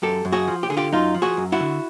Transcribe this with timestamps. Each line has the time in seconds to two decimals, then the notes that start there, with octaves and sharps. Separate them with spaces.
0.02 F#2 G4 A4
0.25 F#2
0.32 F#4 G#4
0.48 F3
0.63 G4
0.70 D3 G#4
0.77 F4 G4
0.92 F#2 D#4 F4
1.14 F3
1.22 F#4 G#4
1.37 F#2
1.52 E4 F#4
1.60 D3